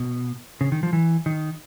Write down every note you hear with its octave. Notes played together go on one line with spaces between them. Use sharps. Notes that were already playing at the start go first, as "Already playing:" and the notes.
Already playing: B2
C#3
D#3
F3
E3
D#3